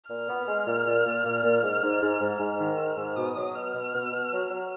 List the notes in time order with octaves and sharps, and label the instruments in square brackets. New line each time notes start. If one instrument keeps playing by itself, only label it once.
[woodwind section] A#2 [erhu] F6
[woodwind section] B3
G#3
A#2
A#2
A#2
A#2
A#2
G#2
G#2
G#2
G#2
[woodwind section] G#2 [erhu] F6
[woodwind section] D#3
G#2
G#2
[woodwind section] B2 [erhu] D#6
[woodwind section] F#3
[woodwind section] B2 [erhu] F6
[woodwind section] B2
B2
B2
F#3
F#3